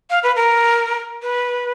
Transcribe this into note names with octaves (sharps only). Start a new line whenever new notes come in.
F5
B4
A#4
B4